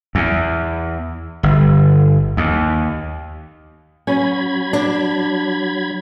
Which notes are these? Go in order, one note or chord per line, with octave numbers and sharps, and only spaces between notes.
E2
G1
D#2
F#3 C#4 B5 G#6
D4